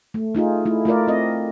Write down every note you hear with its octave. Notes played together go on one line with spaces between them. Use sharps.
A3
A3 D#4 F4 G#4
A3 E4
A3 F4 A#4 D5
C4 D#5